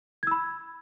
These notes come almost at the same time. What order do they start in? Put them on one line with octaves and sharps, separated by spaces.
G#6 E6 B5